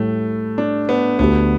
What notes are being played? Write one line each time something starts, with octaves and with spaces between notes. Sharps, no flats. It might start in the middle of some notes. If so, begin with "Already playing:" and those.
Already playing: A2 G3 A3
D4
B3
D2 D3 A3 B3 G4